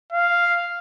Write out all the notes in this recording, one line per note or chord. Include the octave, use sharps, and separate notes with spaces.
F5